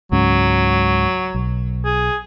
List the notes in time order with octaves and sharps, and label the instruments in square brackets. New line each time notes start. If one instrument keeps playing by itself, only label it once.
[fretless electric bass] C#2 G#2 C#4 [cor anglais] F#3
[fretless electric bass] B1
[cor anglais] G#4